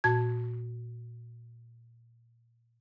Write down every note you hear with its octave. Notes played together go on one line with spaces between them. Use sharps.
A#2 F#4 A5 G#6